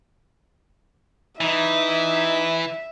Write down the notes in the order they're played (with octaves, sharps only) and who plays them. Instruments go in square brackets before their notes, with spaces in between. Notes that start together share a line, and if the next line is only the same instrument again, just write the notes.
[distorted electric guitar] E3 [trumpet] D#4 [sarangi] E5